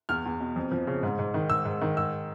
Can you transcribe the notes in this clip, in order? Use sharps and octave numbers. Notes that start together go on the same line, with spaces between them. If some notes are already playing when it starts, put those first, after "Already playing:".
E2 F6
E2
B2
F2
F3
C#3
G#2
G#2
D#3
G#2 E6
G#2
D#3
G#2 E6